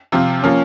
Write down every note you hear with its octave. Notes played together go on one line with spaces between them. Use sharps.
C3 F3 C4 F4
F3 A#3 C#4 F4